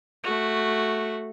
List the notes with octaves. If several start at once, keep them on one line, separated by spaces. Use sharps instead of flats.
A3 F#4